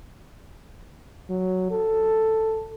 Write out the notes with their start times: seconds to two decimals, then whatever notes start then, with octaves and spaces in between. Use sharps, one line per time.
1.30 F#3
1.71 A4